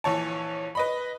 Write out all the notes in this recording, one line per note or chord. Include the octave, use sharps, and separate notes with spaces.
A#1 E3 C#5 A5
B4 D#5 B5